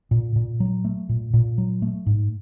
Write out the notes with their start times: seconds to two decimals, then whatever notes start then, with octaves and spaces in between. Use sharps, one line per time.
0.11 A#2
0.36 A#2
0.60 F#3
0.85 A3
1.09 A#2
1.34 A#2
1.58 F#3
1.82 A3
2.06 G#2